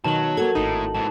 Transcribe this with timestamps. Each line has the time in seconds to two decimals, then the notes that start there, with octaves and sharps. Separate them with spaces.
0.04 B2 D#3 F#3 A5 F#7
0.37 A#3 F#4 A4 G#6
0.55 G#1 A2 D#4
0.95 G#2 E3 A5